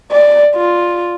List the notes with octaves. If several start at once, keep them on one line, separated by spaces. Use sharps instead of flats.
D5
F4